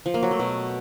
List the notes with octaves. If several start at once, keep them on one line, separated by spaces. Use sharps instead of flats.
F3
A#3
F#3
A3
B2